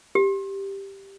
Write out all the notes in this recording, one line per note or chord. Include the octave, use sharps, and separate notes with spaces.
G4